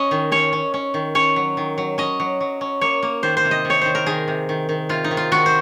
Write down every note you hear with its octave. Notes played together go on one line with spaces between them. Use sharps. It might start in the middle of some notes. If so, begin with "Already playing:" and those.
Already playing: C#4 D#5
D#3
C#4 C#5
C#4
C#4
D#3
C#4 C#5
F#3
D#3
F#3
C#4 D#5
F#3
F#3
C#4
A#3 C#5
A#3
D#3 C5
C5
C3
D#5
C3
C#5
D#3 C5
A#4
D#3 G#4
C3
D#3
D#3
C3 F4
D#4
D#3
F4
D#3 F#4
C5